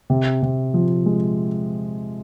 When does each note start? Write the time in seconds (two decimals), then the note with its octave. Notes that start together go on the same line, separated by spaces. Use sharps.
0.10 C3
0.42 C3
0.74 F3
1.06 G#3